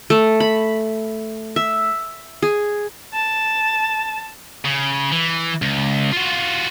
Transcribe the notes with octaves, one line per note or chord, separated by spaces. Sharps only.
A3
B5
E5
G#4
A5
C#3
E3
C#2
F4 F#4